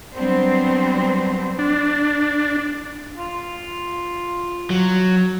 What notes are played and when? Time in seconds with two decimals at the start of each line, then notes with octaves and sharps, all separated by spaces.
0.14 F#3 G3 B3 C4 D4 C5
1.59 D4
3.18 F4
4.70 F#3